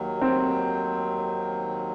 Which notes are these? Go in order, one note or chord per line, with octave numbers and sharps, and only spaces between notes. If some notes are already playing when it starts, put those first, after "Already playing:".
Already playing: D#2 D#3 F#3
C4